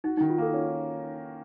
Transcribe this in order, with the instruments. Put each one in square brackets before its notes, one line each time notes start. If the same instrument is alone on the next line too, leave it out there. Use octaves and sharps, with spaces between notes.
[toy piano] D#4 [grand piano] F#4
[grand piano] D#3 [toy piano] D#4
[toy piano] F4
[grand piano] A#3 [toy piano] A4
[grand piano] C#4 [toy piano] A4